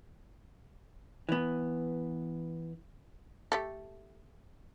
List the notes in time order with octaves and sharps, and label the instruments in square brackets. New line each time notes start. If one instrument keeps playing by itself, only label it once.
[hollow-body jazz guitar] E3 B3
[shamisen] A3 G4 A4